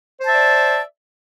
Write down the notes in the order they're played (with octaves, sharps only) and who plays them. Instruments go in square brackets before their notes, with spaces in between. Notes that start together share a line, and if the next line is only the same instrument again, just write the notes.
[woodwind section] C5
A5
E5
D5